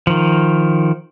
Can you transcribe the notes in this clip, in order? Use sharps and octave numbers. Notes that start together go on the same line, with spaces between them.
D#3 F3